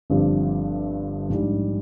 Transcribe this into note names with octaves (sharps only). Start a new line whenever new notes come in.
G1 G2 F3 C4 G4
A#1 G#2 G3